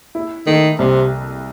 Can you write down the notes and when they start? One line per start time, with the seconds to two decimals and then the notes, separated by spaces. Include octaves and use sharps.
0.15 E4
0.47 D#3 A3
0.79 C2 C3